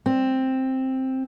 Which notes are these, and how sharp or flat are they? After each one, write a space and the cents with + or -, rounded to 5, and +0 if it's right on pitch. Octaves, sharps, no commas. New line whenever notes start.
C4 +5